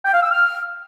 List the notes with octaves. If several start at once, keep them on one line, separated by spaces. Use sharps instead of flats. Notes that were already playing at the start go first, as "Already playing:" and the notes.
G5
F5
E6
F6